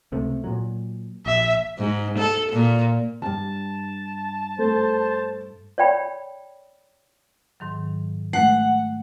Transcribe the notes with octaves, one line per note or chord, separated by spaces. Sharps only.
C#2 C3 A3
A#2 F#3
A#1 E5
G#2
A4
A#2
D2 G2 A5
A3 C5
C#5 D5 G5 B5
G#2 D#3 F#3
G#3 A3 F#5